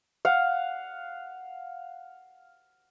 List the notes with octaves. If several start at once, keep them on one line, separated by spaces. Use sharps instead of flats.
F5 F#5